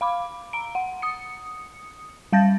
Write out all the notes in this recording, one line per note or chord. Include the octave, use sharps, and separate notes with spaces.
F5 B5 D6
A#5 D7
F#5
D#6 C#7
G3 F5 A5 G6 A6 A#6